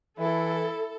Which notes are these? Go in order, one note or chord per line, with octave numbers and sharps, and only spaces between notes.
E3 E4 A4